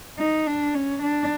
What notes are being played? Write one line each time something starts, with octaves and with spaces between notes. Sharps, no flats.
D#4
D4
C#4
D4